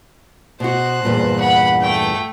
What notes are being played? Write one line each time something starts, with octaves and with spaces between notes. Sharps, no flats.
B2 F#4 C5 F#6
E2 G2 A#2
F#5 B5
A3 G5